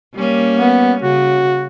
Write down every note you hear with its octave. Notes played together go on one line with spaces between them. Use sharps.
G3 A#3 C#4
B3
C#3 F#4